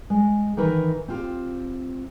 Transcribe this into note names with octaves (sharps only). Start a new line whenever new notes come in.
G#3
D#3 E3 D#4 A#4 B4
C4 F4 G4